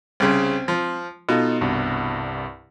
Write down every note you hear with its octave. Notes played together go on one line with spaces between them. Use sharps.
C2 C#3 C4 C5
F3
B2 D#4 F4 A4
C2 G2